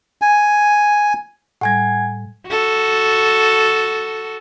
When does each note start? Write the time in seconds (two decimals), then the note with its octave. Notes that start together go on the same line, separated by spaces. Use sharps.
0.22 G#5
1.61 A2 G3 F#5 G#5 G#6
2.48 F#4 A4